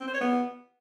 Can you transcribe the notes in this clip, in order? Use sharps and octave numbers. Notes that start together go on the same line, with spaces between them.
C4
C5
C#5
B3